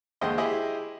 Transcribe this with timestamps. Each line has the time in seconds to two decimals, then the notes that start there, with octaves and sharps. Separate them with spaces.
0.21 D#2 D3 G#3 C5 D#5 G5
0.38 E4 G4 G#4 C5 D#5